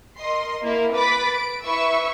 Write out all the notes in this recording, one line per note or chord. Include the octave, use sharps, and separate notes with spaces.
A#4 D#5 C6
A#3 E4 A#4
B4 B5 D6 A6 B6
D7
E4 B4 E5 C#6 E6